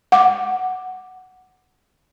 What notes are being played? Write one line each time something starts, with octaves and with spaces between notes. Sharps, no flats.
F#5 D6